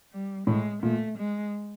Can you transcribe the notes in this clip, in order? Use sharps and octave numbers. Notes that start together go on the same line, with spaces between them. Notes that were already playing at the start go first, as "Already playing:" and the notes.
G3
A2 G#3
A#2 A3
G#3